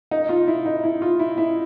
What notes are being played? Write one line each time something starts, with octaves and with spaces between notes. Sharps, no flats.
D#4
F4
E4
D#4
E4
F4
E4
E4